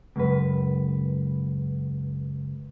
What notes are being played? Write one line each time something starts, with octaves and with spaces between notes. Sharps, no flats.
C#2 F#2 B4